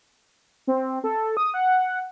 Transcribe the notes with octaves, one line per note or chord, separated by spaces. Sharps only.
C4
A4
D#6
F#5